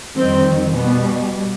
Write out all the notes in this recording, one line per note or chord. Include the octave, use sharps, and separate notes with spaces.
F2 D#3 G3 C4
B2 G3 B3